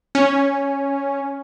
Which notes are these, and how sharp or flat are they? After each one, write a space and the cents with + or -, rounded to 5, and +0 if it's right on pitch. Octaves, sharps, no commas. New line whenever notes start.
C#4 +0